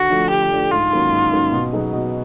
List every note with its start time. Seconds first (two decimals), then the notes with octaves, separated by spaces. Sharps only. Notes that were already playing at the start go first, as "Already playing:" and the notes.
Already playing: D3 F#4
0.10 F3 A3 D4
0.30 D3 G4
0.51 F3 A3 D4
0.71 G#2 F4
0.91 D#3 F#3 A#3 C#4
1.11 G#2
1.31 D#3 F#3 A#3 C#4
1.52 B2
1.72 F#3 B3 D#4 G#4
1.93 B2